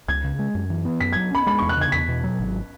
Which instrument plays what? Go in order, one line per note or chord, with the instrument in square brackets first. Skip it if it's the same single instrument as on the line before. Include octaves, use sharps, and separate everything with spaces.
[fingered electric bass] C#2 [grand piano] G#6
[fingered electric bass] C#3
G#3
F#2
E3
B3
[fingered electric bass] F#2 [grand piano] B6
[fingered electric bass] F#3 [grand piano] G#6
[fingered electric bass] C#4 [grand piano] B5
[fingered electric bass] G#3 [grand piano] B5
[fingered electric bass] E2 [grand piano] C#6
[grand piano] F#6
[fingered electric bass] C#3 [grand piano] G#6
[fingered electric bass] E2 [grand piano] B6
[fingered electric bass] B2
F#3
G#1